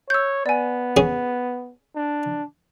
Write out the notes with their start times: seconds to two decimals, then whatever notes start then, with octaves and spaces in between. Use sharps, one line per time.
0.10 C#5 E6 G6
0.46 B3 D5 G#5
0.97 C#4 G#4
1.96 D4